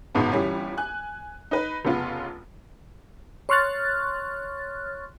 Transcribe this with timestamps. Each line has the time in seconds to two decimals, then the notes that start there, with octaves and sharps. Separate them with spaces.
0.15 G1 G#2 B2 B3 A5
0.32 G1 E3 G3 C#4
0.77 G#5 F#6
1.51 D#4 B4
1.85 F1 C#3 B3 F4
3.49 C#5 C6 C#6 F6 F#6 A6